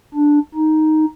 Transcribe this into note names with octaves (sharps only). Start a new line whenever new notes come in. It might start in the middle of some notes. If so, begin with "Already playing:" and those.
D4
D#4